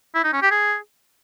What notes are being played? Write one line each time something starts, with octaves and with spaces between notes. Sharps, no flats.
E4
D#4
C#4
G4
G#4